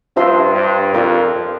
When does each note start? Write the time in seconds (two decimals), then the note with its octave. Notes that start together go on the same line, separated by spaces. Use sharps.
0.16 G2 F4 C5 E5 A5 C6
0.55 G2
0.94 F2 F4 A#4 D5